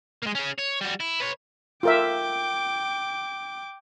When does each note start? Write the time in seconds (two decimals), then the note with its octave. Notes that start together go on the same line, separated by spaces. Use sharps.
0.23 G#3 A#3
0.35 C#4 G#4
0.59 C#5
0.81 G3 F#4
1.00 E4
1.20 B4 C#5
1.83 F4 A#4 E5 G5 D6